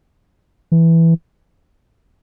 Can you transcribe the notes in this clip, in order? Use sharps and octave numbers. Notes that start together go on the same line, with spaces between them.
E3